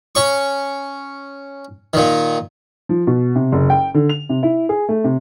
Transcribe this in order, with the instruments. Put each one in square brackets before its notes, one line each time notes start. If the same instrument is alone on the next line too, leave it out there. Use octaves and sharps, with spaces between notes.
[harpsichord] C#4 C#6
A#2 D#3
[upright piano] F3
B2
C3
F#1
G5
D3
F7
C3
E4
G#4
A3
C3